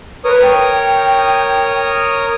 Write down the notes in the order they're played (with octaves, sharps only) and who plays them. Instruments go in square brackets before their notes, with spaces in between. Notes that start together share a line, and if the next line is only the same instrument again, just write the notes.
[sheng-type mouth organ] A#4 C#5 D#6 [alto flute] B4
[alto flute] G5